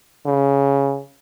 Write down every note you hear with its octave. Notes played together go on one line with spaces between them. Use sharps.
C#3